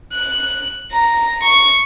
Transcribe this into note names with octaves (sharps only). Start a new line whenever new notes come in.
F#6
A#5
C#6